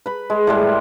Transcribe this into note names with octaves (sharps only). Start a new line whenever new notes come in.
B4 B5
G#3
A2 G3 G#3